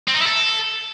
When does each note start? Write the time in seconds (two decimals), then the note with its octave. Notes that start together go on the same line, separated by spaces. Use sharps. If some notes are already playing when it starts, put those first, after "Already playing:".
0.08 C4
0.14 D#4
0.20 E4
0.27 A4